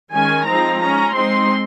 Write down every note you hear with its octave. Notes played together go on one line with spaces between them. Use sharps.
D#3 G#3 C#4 G#5
F3 G#3 C4 D#4 A#5
G#3 C#4 A#5
G#3 C4 D#4 C6